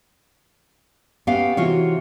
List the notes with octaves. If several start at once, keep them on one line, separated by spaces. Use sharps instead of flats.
B3 C#4 G4 F5
C3 E3 F4 F#4 C#5